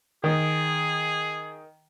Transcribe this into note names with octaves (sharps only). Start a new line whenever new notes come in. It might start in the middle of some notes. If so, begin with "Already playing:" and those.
D#3 G#4